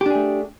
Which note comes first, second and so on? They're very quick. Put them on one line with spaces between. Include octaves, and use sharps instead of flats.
G4 D4 G#4 A3